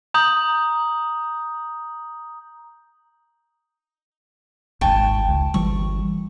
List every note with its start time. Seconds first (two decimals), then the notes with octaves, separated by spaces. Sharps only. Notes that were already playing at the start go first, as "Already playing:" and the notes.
0.14 A#5 D#6 G6 F#7
4.81 D#1 G#1 G#2 G5 A5 C#6
5.28 C#2
5.54 G1 E3 G3 C#6